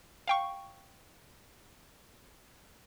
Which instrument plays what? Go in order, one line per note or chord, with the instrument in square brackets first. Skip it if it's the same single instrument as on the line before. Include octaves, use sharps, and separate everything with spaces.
[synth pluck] F5 G5 C#6